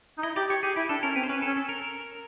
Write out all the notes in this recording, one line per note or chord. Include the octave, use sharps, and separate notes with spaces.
D#4
E4 D#5
G4 D5
G4 C#5
G4 G#4
E4 G4
D4 A4
C#4 A#4
C4 B4
C5
C#4 B4
A4
C#4
A4
A#4
A#4